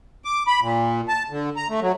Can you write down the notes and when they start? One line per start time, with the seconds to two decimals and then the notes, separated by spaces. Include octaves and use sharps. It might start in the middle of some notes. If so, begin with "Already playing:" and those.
0.25 D6
0.47 B5
0.61 A#2
1.08 A5
1.30 D3
1.57 A#5
1.69 A3
1.81 F#3